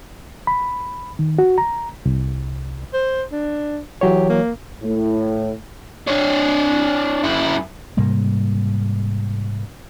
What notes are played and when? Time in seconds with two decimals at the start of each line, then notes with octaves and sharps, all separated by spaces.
0.47 B5
1.19 D#3
1.38 F#4
1.58 A#5
2.06 C2
2.93 C5
3.32 D4
4.01 E3 F#3 G4 C#5
4.29 A#3
4.82 A2
6.07 D4 C#5
7.23 F#2 E4
7.97 G#2 C3 G3 A#3